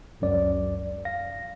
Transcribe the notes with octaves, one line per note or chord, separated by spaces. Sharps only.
G1 C#2 F#2 D5
F5 A#6